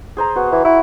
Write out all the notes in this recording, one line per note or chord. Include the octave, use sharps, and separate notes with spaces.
G#4 C5 A#5
B2 F#4
E3
E4 F#4